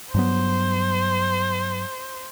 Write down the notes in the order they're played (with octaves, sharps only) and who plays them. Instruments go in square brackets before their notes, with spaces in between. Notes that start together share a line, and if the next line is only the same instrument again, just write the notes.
[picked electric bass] G2 F#3 B3 [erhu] C5